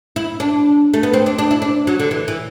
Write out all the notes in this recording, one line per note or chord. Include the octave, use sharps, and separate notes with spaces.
E4
D4
A3
B3
C4
D4
D4
E4
D4
F#3
D3
E3
E3